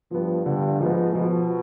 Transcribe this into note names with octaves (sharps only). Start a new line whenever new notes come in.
G2 F3 B3
G2 D3
G#2 F3 B3
B2 F3